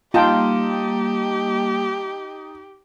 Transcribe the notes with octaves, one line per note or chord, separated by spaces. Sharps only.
G3 A#3 D#4 F4 G4 G5 A5